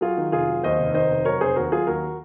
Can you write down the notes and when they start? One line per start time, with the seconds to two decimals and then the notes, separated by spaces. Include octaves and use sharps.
0.01 F#3 F4 G#4
0.17 D#3
0.32 F1 F4 G#4
0.48 F#3
0.63 D#2 C5 D#5
0.79 F1
0.94 D#3 C5 D#5
1.10 F1
1.25 F#3 A#4 C#5
1.41 F1 G#4 C5
1.56 D#2 F#4 A#4
1.72 F#3 F4 G#4
1.87 D#2 F#4 A#4